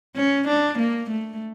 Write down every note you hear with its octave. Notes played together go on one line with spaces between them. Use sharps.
C#4
D4
A#3
A3